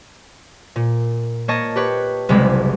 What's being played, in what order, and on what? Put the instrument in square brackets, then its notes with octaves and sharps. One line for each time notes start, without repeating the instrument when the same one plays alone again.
[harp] A#2
A#3 C#5 D#5 A5
G4 B4 C#5
F#1 C2 C3 G#3 B5